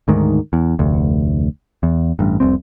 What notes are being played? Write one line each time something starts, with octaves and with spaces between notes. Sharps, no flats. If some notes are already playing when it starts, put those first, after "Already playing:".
D2 G#2 D#3
E2
F1 D2
E2
A1 G2
F1 C2 C4